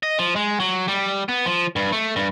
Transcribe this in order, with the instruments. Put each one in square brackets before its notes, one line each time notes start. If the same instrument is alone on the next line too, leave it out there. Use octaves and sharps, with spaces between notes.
[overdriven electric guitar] D#5
F3
G#3
F#3
G3
B3
F3
G2
A3
G2